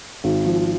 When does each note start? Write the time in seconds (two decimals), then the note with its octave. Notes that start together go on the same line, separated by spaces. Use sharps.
0.24 G#1
0.45 F3